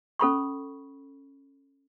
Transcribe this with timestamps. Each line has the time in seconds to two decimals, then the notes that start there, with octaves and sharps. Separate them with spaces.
0.19 C#4 A4 B5 C#6